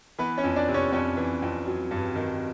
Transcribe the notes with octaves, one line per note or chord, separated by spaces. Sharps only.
E3 B3 B4
C#4 C#5
F2
D4 D5
C3
C#4 C#5
F2 C#4 C#5
E3
F2
F#3
G2
D#3